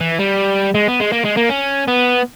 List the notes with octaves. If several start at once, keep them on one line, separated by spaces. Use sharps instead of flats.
E3
G3
G#3
B3
G#3
A#3
G#3
A#3
C#4
B3